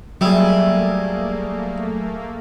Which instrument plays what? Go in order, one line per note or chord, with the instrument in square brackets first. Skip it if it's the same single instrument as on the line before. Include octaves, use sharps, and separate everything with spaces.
[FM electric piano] F#3 [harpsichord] G3 [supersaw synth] A3 A#3 [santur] G#4 E5